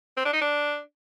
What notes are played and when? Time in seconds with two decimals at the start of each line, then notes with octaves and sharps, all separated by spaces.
0.17 C4
0.25 D4
0.33 D#4
0.41 D4